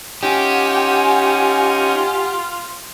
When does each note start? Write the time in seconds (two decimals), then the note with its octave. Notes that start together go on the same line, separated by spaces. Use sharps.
0.23 C#4 D#4 F4 G4 F#5 G#5